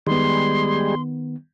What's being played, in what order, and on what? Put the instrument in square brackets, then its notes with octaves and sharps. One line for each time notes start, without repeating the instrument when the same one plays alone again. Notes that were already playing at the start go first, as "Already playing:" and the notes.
[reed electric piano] D#3 B3 [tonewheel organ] G3 G#3 [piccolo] C6